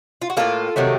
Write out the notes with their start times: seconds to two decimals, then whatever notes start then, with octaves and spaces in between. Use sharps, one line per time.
0.22 F4
0.30 F#4
0.37 A2 F#3 A#3 F4 A4
0.76 C3 D#3 F#3 A3